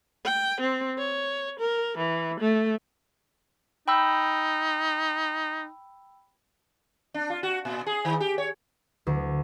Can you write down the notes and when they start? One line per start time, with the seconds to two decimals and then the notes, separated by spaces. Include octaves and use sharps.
0.25 G5
0.60 C4
0.98 C#5
1.60 A#4
1.98 E3
2.40 A3
3.88 D#4 G5 B5 E6
7.14 D4
7.30 F4
7.43 F#4
7.65 A#2
7.87 G#4
8.05 D#3
8.20 G4
8.38 C#5
9.07 D2